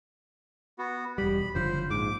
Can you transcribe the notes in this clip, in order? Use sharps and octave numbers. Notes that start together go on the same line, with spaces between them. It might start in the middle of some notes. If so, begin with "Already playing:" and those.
B3 F#4
E1 G3 B5
F#1 D3 F3 C5
A#1 G#2 D6